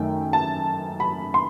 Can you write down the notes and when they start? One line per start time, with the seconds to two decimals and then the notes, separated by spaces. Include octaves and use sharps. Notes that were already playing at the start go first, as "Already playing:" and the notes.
Already playing: F#2 D#3 A3 G5
0.33 A5
1.00 B5
1.34 C6